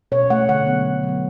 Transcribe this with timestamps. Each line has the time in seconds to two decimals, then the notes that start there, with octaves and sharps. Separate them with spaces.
0.12 B2 C#5
0.30 A3 F#5
0.49 D3 F#5
0.67 F#3 B3
0.86 D3
1.03 F#3
1.09 B3